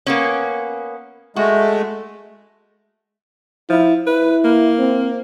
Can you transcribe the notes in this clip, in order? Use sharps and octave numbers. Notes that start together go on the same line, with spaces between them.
A#3 B3 C#4
G#3 A3 F#4
F3 E4
E4 B4
A#3
C4